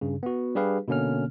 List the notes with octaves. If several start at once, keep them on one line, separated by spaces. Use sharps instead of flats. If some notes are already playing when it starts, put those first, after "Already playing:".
G2 C#3
B3 F#4
G3 D4 G4 G#4 B4 F5
B2 D3 A#3 C#4 F6